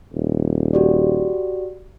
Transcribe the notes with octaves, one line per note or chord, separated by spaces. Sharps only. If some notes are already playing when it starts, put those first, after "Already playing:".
D#1
F#4 G4 D5